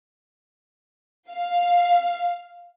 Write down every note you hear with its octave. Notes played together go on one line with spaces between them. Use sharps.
F5